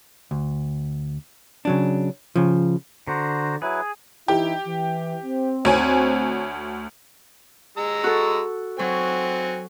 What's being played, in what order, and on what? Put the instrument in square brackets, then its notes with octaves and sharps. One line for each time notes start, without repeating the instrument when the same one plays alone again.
[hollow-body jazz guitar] D2
C#3 F#3 D4
C#3 F3
[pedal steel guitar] D3 [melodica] F#4 C5 A#5
[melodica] F#3 E4 B4 [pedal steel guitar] G#4
[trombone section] E3 D#4 E4 [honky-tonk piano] G4
[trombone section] E3
C4
[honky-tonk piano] D2 C#5 G#5
[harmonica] G#3 A#5 E6
[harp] F#4 A4
[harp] F#3 [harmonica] C4 F#4 G#5